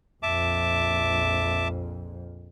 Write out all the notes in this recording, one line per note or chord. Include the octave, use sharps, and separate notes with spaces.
A#1 F2 E5 A5 D6